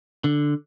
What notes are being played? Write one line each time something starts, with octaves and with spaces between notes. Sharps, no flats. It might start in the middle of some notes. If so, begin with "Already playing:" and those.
D3